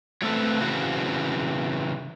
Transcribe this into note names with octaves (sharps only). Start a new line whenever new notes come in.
F#3 A3 C4 A4 B4
C#3 E3 C4 F#4